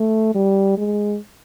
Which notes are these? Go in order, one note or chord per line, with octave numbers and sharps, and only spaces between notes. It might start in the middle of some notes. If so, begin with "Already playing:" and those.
Already playing: A3
G3
G#3